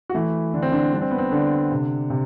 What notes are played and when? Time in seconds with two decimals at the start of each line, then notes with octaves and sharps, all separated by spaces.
0.10 F#4
0.14 E3 A3 E4
0.54 D3 D4
0.62 C4
0.72 D3 D4
0.92 G3 D4
1.01 C4
1.11 B3
1.18 C4
1.32 D3 D4
1.71 C3
2.10 C3